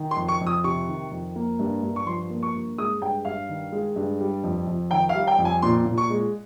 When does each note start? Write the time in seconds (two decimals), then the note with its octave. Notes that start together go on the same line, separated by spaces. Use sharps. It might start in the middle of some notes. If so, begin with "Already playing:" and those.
Already playing: D#3
0.11 C6
0.16 F2
0.28 C#6
0.41 F2
0.47 D#6
0.64 C3 C#6
0.88 D#3
1.11 F2
1.36 A#3
1.59 G2
1.83 G2
1.96 C#6
2.06 F3 C6
2.30 A#3
2.43 C#6
2.55 G2
2.78 G#3 D#6
3.01 G2 G5
3.25 G2 F5
3.49 D#3
3.72 G#3
3.96 G2
4.21 G3
4.44 F2
4.67 F2
4.91 D#3 G5
5.09 F5
5.15 G3
5.27 G5
5.38 F2
5.45 G#5
5.62 A#2 C6
5.86 A#2
5.98 C#6
6.10 G#3